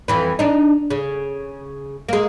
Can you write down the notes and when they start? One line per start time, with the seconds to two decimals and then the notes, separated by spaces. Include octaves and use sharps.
0.08 F2 E3 B4
0.39 D4 D#4
0.90 C#3
2.09 G#3 A#3